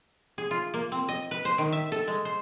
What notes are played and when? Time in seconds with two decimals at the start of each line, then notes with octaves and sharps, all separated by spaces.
0.38 G#4
0.51 F4
0.74 A#3
0.92 C4
1.09 D#5
1.31 B4
1.45 C5
1.58 D#3
1.72 E5
1.92 A4
2.08 G#3
2.25 C5